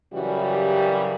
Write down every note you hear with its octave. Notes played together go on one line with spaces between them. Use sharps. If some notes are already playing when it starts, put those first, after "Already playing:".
F#2 C#3 E3 G3 F#4
G4